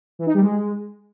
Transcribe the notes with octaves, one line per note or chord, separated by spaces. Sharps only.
E3
D#4
G3
G#3